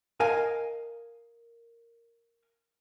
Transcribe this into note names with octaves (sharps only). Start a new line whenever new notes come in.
A#4 D#5 F5 G#5